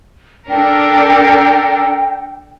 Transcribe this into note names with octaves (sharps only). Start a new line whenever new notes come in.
D4 A4 A#4 G5